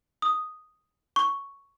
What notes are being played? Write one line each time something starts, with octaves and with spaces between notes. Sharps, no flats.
D#6
C#6